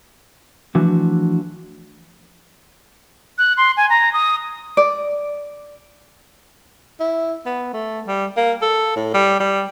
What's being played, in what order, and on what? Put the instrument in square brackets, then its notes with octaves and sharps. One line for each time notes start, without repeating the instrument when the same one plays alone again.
[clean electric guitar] E3 F3 A3 D4 F#4
[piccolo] F#6
C6
G#5
A#5
D#6
[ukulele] D5
[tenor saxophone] E4
B3
A3
G3
A#3
A4
A2
G3
G3